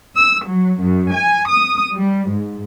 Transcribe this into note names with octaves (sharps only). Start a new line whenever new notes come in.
E6
F#3
F#2
G#5
D#6
G3
G#2